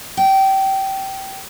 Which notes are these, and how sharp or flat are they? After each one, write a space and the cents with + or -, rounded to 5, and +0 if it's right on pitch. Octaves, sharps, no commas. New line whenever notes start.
G5 -20